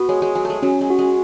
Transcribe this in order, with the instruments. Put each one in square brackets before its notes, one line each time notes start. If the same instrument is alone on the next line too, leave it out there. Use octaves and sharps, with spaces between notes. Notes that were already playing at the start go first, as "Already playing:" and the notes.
Already playing: [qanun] B3 [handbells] F#4
[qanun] G#3 [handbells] C#5
[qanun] G#3
[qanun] F#3 [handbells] G#5
[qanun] A3
G#3
[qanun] F#3 [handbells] C#4
[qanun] G#3
[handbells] F#4
[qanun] G#3